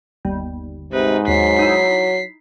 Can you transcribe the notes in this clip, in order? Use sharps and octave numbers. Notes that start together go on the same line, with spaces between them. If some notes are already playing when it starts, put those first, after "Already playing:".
G1 D#2 G3
G#2 C3 D#4 B4
D#2 F#3 B6 C7
D#4 E4